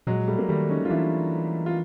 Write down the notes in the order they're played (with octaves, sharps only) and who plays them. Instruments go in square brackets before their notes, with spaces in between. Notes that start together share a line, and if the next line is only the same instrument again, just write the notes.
[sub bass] A#2 [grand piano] F#3 G#3
[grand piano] G3 A3
A#3
[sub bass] D#3 [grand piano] G3 A3
[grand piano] C#4 D#4
F4
[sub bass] E3 [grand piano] D4 E4
[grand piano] F4